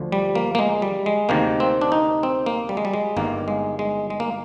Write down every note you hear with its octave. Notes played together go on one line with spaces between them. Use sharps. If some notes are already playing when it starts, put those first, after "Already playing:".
Already playing: D2 D3 F3
G3
A#3
A#3
G#3
G3
G#3
D2 C3 D#3 A#3
C4
D4
D#4
C4
A#3
G3
G#3
G3
G#3
G1 G2 D#3 A#3
G#3
G#3
G#3
A#3